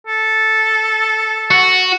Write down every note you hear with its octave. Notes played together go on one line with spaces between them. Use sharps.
A4
F#4